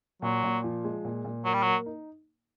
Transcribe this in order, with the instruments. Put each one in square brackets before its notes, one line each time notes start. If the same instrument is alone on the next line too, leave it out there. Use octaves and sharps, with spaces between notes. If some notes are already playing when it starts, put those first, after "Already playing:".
[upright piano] A#2 [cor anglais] F#3
[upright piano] A#2
F3
G#3
A#2
A#2
[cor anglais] F#3 [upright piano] A#3
[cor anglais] G3
[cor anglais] F#3 [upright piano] A#3
[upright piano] D#4